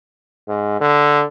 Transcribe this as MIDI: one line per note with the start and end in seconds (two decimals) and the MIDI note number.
0.48 0.77 44
0.81 1.24 50